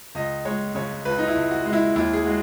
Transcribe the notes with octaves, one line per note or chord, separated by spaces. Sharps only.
C#2 D#5
G#3 C#5
C#3 C#5
C#2 B4
D#4
E4
C#2
F#4
G#3
E4
D#2 E4
G#4
G#3 F#4